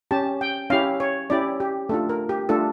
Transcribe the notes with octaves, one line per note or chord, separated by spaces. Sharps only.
C#4 G4 A5
G5
C#4 E4 G4 F5
C#5
C#4 E4 G4 D5
G4
A3 D4 F4 A4
A#4
G4
A3 D4 F4 A4